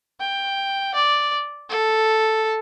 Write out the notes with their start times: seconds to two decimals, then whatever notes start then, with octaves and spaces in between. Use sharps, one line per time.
0.20 G5
0.94 D5
1.70 A4